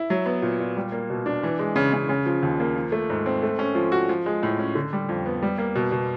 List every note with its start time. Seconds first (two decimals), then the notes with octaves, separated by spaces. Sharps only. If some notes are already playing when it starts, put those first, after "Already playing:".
Already playing: E4
0.10 F#3
0.26 B3
0.42 A#2
0.60 A#2
0.77 G3
0.92 A#3
1.10 B2
1.26 D4
1.43 E3
1.59 G#3
1.76 C#3
1.93 C#3
2.09 C#3
2.26 F3
2.43 D#2
2.60 A#3
2.76 F3
2.92 A3
3.10 G#2
3.26 C4
3.43 A3
3.59 C#4
3.75 F3
3.92 F#4
4.09 F3
4.26 G#3
4.43 A2
4.58 C#4
4.75 D3
4.93 G3
5.09 F2
5.26 B3
5.42 G3
5.58 A#3
5.75 B2
5.92 B2